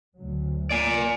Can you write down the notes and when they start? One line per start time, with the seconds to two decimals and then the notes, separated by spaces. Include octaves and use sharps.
0.16 D2 F#3
0.71 A#3 D5 G#5